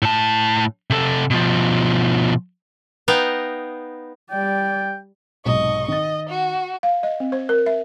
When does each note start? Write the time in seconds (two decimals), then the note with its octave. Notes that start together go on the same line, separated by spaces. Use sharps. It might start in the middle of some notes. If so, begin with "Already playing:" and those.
0.02 A2 A5
0.90 C3 A4
1.31 B2 F3
3.08 B3 D#4 F5 G5
4.31 G3 D5 G5
5.45 B1 G#2 C3 D#5 C#6
5.88 D#3 D#5 A6
6.29 F#4
6.83 F5
7.03 D#5
7.20 C4
7.32 C5
7.49 A#4
7.66 E5